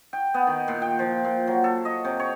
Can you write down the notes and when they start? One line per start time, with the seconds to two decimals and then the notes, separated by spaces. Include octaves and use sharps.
0.13 G5
0.34 B3
0.47 D#3
0.68 A#2
0.82 G5
0.99 F3
1.25 A#2
1.47 F#3
1.64 A4
1.85 D#5
2.05 C3
2.19 C#5